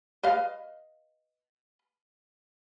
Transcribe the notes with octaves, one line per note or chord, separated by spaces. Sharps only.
B4 D#5 F5